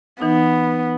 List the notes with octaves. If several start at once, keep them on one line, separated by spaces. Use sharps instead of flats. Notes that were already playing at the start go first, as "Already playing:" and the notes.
E3 B3 D#4